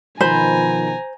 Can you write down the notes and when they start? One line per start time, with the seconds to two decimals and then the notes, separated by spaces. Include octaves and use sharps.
0.21 B2 D#3 F3 C5 G#5 A#5 B5